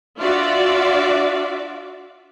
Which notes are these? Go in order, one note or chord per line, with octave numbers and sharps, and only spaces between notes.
D4 F4 F#4 D5 E5